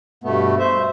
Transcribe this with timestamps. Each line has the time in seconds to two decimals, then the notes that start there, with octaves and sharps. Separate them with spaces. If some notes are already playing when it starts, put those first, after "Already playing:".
0.24 G2 B2 A3 B3
0.59 C5 E5